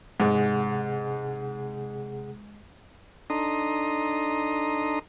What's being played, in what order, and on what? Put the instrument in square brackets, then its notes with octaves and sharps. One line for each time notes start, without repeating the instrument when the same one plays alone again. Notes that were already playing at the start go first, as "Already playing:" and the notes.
[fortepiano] G#2 [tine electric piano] C3 G#4 F#5
[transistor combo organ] D4 D#4 A4 A#5 C6 D#6